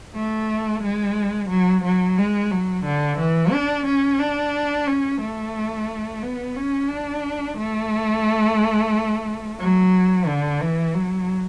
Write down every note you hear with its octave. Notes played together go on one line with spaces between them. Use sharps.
A3
G#3
F#3
F#3
G#3
F#3
D3
E3
D4
C#4
D4
C#4
A3
B3
C#4
D4
A3
F#3
D3
E3
F#3